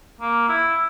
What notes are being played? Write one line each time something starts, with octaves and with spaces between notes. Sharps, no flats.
A#3
E4